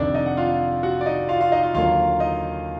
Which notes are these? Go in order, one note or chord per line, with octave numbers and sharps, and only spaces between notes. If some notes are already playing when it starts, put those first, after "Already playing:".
Already playing: F1 F2 D#3 D4 D5
D#4 D#5
F#5
F4 F5
F#4 F#5
D5
D#4 D#5
F4 F5
F4 F5
D#4 D#5
F4 F5
D#2 D3 F#3 A#3 F4 F5
D#4 D#5